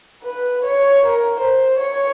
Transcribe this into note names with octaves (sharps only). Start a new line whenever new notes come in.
B4
C#5
A#4
C5
C#5